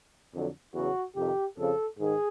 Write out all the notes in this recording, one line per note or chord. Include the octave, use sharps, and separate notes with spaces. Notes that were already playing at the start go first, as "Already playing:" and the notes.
F2 D3 F#3
E2 C#3 F#3 F#4
F2 C3 D#3 G4
F2 C#3 F3 A4
G#2 D#3 G#4